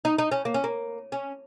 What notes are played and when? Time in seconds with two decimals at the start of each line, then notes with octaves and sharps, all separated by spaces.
0.05 D#4
0.18 D#4
0.32 C#4
0.45 A#3
0.54 C#4
0.64 A#3
1.12 C#4